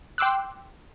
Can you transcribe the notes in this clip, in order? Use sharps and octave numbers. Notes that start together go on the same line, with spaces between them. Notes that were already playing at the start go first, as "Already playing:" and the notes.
G5 C6 D6 E6 F#6